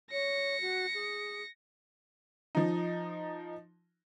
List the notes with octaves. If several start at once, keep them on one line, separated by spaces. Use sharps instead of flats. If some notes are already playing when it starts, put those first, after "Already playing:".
C#5 A#6 C#7
F#4
G#4
F3 D#4